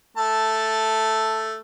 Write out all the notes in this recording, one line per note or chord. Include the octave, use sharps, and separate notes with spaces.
A3 A5